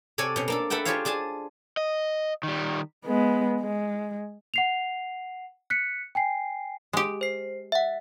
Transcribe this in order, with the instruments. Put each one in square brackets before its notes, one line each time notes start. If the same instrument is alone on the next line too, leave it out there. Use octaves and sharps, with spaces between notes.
[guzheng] C3 A4 C#5 D5 G#5
B2 C#4
A#3 D4 A4
A4 B4 E5 F#5 G5
F4 G4 G#4 C5 C#5 F5
D4 G#4 G#5 A5
[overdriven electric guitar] D#5
D#3 G3
[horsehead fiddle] G#3 B3
G#3
[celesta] F#5 C7 F7
F#6 B6 C#7
G5 G#5 C7
[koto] G#3 G4
[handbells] C5 C7
E5 F#5